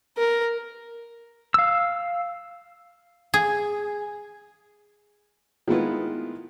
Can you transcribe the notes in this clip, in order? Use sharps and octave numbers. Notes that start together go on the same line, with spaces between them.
A#4
F5 E6
G#4
D#3 G#3 A3 B3 E4 F4